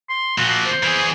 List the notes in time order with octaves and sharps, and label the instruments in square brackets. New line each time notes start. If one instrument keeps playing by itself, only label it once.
[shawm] C6
[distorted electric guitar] A#2 F3 [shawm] F#4
[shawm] C5
[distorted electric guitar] E3 G#4